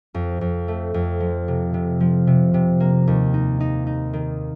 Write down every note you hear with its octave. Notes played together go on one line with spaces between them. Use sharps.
F2
F2
A3
F2
F3
C3
C3
F3
C3
C3
A#3
D#2
D#4
D#4
D#4
D#3